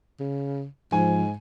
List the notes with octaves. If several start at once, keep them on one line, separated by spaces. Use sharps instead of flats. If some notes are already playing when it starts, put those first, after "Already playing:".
C#3
G#2 F3 G#5